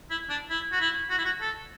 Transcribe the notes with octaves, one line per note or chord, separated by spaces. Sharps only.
E4
D4
E4
F#4
E4
F#4
E4
F#4
A4